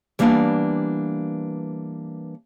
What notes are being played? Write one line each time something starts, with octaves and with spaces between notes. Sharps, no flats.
E3 G3 A#3 B3 D4